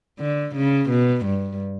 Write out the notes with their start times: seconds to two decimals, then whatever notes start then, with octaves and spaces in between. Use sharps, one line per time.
0.19 D3
0.55 C#3
0.90 B2
1.26 G2